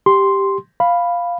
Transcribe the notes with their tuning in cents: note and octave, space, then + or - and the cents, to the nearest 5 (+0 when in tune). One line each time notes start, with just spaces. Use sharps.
G4 +0 C6 +0
F5 +0 B5 +0